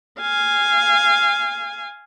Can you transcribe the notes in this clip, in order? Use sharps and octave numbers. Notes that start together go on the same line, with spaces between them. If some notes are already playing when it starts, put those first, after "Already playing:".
F5 G#5